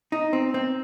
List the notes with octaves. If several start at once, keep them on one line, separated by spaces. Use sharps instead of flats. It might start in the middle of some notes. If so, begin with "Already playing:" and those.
D#4
C4
C4